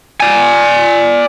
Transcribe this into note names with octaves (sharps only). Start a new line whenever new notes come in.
D5 G#5